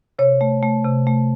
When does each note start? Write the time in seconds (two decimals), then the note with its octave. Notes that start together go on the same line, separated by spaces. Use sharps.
0.19 C3 C#5
0.41 A3
0.63 A3
0.84 C3
1.07 A3